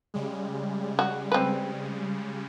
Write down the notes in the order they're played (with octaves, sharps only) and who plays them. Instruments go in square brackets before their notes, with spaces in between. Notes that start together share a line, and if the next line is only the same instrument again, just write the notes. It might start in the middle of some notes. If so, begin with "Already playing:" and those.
[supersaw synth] C#3 G3 G#3
[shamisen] F#4
C4 B4